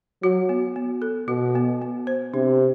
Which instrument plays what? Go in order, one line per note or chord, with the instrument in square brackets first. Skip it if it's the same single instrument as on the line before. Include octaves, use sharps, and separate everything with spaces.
[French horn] F#3 [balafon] F#4
[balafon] B3
B3
A4
[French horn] B2 [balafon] F#4
[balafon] B3
B3
C5
[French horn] C3 [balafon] D4